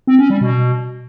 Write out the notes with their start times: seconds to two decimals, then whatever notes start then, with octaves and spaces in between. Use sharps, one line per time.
0.07 C4
0.19 C#4
0.30 G3
0.41 B2